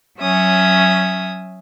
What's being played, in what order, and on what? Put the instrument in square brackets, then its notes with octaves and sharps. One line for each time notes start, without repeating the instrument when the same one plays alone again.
[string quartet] F#3 C#4 E5 D#6